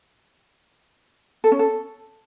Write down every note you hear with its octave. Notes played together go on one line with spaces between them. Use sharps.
A4
C#4
A4